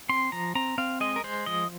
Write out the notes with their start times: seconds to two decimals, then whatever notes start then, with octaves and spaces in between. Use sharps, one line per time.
0.09 C4 C6
0.32 F3 A#5
0.55 C4 A#5
0.78 C4 F5
1.00 G#3 D#5
1.16 A#4
1.24 G#3 C5
1.46 F3 D#5